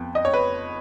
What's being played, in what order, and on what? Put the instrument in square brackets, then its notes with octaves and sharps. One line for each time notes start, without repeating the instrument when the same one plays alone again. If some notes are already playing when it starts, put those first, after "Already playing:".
Already playing: [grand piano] F2 B3
D#5
C#5
B4